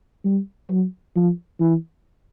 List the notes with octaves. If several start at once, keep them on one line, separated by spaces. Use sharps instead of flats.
G3
F#3
F3
E3